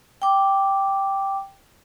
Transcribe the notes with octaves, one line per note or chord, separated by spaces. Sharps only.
G5 D6